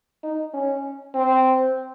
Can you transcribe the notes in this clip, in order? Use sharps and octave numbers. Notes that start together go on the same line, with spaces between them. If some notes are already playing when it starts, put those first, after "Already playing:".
D#4
C#4
C4